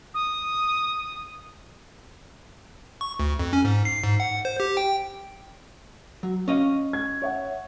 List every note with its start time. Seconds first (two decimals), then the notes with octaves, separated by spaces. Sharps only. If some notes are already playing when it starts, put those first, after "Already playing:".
0.14 D#6
3.01 C#6
3.20 D2
3.39 F2
3.53 C#4
3.65 G#2
3.85 C7
4.04 G#2
4.20 F#5
4.45 C5
4.60 G4
4.77 G5
6.23 F#3
6.48 C#4 D#5 F5
6.93 G#6
7.22 C#5 E5 F#5